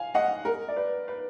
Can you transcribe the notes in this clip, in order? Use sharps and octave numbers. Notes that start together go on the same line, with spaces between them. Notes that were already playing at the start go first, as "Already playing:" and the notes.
Already playing: F5 G#5
D#5 F#5
A#4
D5
B4
B4